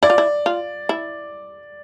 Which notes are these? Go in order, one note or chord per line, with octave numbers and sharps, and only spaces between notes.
E4 D5
F4
E4
F4
E4